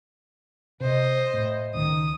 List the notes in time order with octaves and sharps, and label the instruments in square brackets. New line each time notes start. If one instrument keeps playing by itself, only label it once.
[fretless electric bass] C3 [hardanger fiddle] C5 D#5
[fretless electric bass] A2
[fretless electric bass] C#2 D#3 [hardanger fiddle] D#6